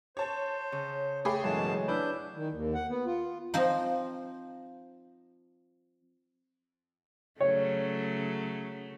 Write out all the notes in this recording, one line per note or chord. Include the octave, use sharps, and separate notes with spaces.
C5 C#5 A5
C#3
A3 G#4 G5 B5 D6
F#2 B2 E3 F#3 G#3 A5
D4 E4 B4 D5 G6
D#3
D#2
F#5
B3
F4
F3 C4 D#4
C#3 F#3 A3 C#5